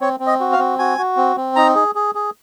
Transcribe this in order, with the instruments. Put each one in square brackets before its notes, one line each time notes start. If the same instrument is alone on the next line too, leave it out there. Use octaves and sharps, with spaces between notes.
[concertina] C4 C#5
C4
D#5
F#4
F5
C4
F#4 G#5
F#4
C4
C4
D#4 A#5
G#4
G#4
G#4